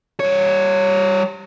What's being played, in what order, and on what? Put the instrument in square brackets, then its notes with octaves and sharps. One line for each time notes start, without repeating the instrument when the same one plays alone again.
[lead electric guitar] G3 C#5